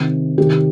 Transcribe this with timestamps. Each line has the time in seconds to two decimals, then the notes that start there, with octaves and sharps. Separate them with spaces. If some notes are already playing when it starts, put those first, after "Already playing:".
Already playing: C3 D#3
0.38 C3 D#3 G4